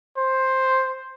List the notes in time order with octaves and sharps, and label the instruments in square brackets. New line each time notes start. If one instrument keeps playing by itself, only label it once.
[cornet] C5